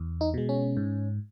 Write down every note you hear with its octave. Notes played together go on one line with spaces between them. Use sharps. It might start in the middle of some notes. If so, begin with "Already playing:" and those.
Already playing: E2
D#4
B2 G#3
C#4
G#2